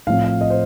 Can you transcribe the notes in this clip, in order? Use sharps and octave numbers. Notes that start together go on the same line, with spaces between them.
A2 F3 A3 C4 F5
F5
D#5
C5